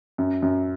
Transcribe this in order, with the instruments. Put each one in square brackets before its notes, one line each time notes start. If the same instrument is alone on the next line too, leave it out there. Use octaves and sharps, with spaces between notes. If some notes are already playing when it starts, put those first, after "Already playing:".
[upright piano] F#2
F#2